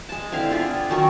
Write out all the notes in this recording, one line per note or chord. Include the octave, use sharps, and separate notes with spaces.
G#3 A5
D3 C4 E4 F5
C4 D4 F4 G#4
D#3 F#3 C#4 D#4